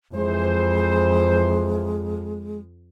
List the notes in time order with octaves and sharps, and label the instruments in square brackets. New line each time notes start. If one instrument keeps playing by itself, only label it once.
[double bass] F2 [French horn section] E3 C5 [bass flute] G#3